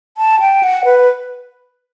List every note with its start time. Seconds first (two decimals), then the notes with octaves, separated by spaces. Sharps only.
0.18 A5
0.40 G5
0.63 F#5
0.85 B4